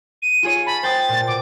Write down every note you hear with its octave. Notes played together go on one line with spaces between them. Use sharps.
D#7
F4 G#4 C#5
A5 B5
C5 G5 D#6 A6
A#2
B2 D6